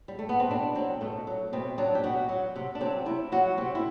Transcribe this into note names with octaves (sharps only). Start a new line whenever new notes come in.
G3
A3
B3
C4
B2 D4
F#3 C4
B2 A3
F#3
B2 C4
F#3 D4
G4
B2 F#4
F#3
C3
D4
F#3 C4
C3 E4
F#3 F#4
C3 C4
E4